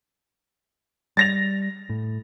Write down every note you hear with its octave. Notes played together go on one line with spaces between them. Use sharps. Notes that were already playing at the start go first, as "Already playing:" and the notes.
G3 A6 A#6 F7
A2